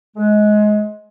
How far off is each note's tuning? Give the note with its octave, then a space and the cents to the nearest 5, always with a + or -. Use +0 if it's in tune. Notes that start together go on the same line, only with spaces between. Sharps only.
G#3 +20